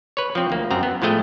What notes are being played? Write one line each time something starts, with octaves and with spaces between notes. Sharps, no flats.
B4 C#5
F3 C4
D2 A#3
F#2 C4 A#5
B3
A2 F3 G#3 A3 D#5 G5